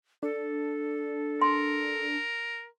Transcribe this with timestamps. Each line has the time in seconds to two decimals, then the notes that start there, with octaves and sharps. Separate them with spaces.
0.23 D4 A4
1.41 A#4 C6